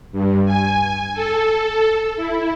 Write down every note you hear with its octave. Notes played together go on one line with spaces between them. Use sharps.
G2
G#5
A4
E4